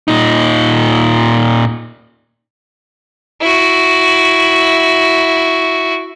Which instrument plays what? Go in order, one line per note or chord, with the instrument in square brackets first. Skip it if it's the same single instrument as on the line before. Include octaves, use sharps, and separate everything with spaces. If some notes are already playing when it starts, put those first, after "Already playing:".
[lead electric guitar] A#2 D#4
[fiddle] E4 F#4